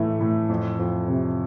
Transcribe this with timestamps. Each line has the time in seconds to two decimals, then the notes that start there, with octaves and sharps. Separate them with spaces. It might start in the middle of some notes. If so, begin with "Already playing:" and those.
Already playing: A2 E3 A3
0.20 A2
0.49 F2
0.79 F2
1.08 C3